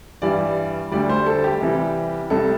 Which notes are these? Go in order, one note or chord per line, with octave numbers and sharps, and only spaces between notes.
G2 E3 G3 D5
D2 D3 G3 D5
C5
A4
G4
C2 C3 E3 G3
C2 C3 G3 A4